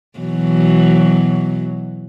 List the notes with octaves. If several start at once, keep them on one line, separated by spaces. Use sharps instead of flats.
B2 E3 F#3